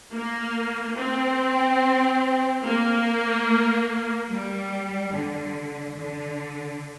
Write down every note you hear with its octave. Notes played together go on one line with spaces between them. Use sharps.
A#3
C4
A#3
G3
D3
D3